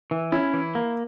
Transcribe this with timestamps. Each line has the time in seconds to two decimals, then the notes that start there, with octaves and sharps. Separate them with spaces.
0.11 E3
0.32 C#4 E4
0.54 E3
0.75 A#3